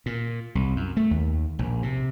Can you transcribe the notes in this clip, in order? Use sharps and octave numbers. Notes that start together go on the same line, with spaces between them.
A#2
C2
F#2
A3
D#2
A#1
C3